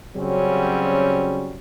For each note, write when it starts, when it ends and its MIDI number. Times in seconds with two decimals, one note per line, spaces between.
0.16 1.58 49
0.16 1.58 54
0.16 1.58 55
0.16 1.58 60
0.16 1.58 61
0.16 1.58 66